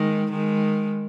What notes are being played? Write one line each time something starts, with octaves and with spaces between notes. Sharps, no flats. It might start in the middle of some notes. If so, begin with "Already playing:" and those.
Already playing: D#3 G#3
D#3 G#3